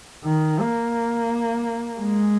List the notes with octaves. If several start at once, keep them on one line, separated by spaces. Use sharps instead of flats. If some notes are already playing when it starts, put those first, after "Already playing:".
D#3
A#3
G#3